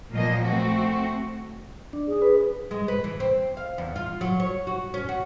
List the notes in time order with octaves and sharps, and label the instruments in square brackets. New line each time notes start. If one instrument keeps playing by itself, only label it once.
[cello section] A#2 F3 F#3 A#3 D#5
A3 C4 F#4
[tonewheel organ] D4
[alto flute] G#4
[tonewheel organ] B4
[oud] G#3
B4
E3
C4
F5
E2
F4
F#3
C#5
F#4
C#4
F#4